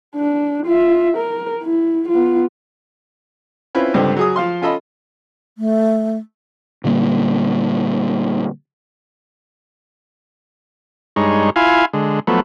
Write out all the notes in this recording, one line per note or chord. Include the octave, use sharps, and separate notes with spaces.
D4
F4 E5
A#4
E4
B3 F4
C4 C#4 E4 F4 B4
C#2 G2 D3 G3 C4
F#3 G#4 D#6
F3 F5 C6
C#4 F4 A4 D#5 B5
A3
A#2 D3 G3 A#3
G2 G#3 D#4 C#5
E4 F4 F5 G#5
D3 G#3
F3 F#3 A3 B3